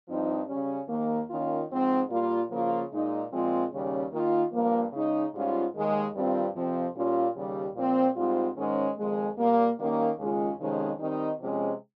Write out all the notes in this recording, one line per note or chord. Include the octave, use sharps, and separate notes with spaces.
G2 F3 C4 D#4
C#3 G3 C#4
D#2 D#3 A#3
D#3 A#3 C#4 F4
G#2 F3 C4
A#2 G3 A#3 F4
C#3 F3 A#3 F4
A#2 G#3 D#4
A#2 F3 G#3 C4 F4
D#2 C#3 G3 C#4
D#3 A#3 F4
G2 F3 A#3
C#3 G#3 D#4
G#2 G3 C#4 F4
D#2 D#3 G#3
G2 D#3 G3 C4 F4
F2 C3 F3 C4
A#2 G3 C#4 F4
D#2 C#3 G3
A#2 F3 C4
G#2 G3 C4 F4
G#2 D#3 G#3 C#4
F2 D#3 G#3
A#2 G3 A#3
D#3 G3 A#3 C#4
D#2 C#3 G#3 C#4 F4
F2 C3 D#3 G#3 C#4
D#3 G3 C4 D#4
C3 F3 G#3 C#4